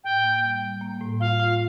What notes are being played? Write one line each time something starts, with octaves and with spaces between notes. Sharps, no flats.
A2 G5
A#3
G3
G3
A#3
A2
F4 F5
F4